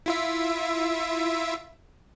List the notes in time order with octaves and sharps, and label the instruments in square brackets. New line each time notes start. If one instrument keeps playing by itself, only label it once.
[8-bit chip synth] E4 F4 E5